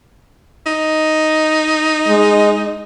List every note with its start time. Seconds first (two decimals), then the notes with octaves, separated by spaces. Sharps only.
0.66 D#4
2.08 G#3